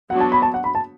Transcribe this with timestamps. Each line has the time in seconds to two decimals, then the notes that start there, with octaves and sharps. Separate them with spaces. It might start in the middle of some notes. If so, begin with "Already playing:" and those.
0.10 F#3 B3 D4 F#5
0.20 A5
0.32 B5
0.42 A5
0.54 F#5
0.64 B5
0.75 A5